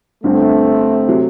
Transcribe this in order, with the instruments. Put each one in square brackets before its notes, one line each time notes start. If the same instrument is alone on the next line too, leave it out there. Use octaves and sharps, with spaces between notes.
[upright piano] G1 G2 D3 [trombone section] A3 C4
[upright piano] C3 F#3